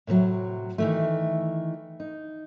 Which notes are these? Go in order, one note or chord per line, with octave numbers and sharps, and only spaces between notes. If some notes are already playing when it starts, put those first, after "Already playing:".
A2 C3 D#3 F#3
D#3 E3 A3
D#4